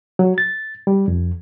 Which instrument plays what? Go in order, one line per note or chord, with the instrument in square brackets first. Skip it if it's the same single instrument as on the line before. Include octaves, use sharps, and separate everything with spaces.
[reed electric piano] F#3
A6
G3
F2